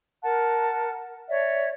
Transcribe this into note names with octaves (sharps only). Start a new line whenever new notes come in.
A#4 F#5 A5 F#6
C#5 D5 E5